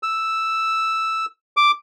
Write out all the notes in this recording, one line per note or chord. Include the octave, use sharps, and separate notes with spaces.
E6
D6